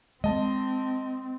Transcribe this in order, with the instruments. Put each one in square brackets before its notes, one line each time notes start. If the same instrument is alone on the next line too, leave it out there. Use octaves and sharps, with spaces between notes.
[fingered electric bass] G#3 [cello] C4 [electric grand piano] D#5 A5